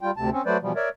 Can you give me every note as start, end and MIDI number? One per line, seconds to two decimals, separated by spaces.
0.01 0.11 55
0.01 0.11 65
0.01 0.11 79
0.17 0.30 38
0.17 0.30 48
0.17 0.30 81
0.32 0.42 60
0.32 0.42 61
0.46 0.57 54
0.46 0.57 57
0.46 0.57 71
0.46 0.57 72
0.46 0.57 74
0.62 0.72 47
0.62 0.72 52
0.62 0.72 53
0.62 0.72 55
0.76 0.89 70
0.76 0.89 73
0.76 0.89 74
0.76 0.89 76